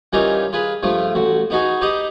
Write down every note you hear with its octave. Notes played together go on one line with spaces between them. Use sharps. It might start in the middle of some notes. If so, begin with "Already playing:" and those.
E3 G3 C#4 D#4 F4 A#4
F4 G#4 B4
G2 F3 A3 F4
A1 F#4
B3 D#4 F#4 G#4
D#4 G4 B4 D#5